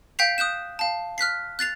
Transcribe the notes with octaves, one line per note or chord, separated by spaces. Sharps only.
F5 G5 G6 B6 C7 F7
D#6 F#6 G6 E7
F5 A5
F6 F#6 B6 C7
F#6 A6 C7 F7